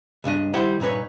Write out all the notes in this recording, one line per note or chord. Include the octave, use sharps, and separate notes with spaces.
C#2 G2 D4 D#5
D#3 G3 E4 C5 F#5 G5
G2 A#2 D#4 B4 C#5